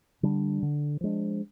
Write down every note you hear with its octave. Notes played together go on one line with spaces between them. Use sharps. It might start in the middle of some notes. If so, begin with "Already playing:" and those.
D3 G3 D4
D3
F3 G#3 D4